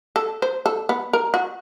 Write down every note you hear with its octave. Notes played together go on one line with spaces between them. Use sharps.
A4
C5
A4
B3
A#4
F#4